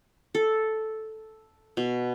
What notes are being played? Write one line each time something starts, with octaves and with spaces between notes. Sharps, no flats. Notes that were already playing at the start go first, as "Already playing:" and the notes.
A4
B2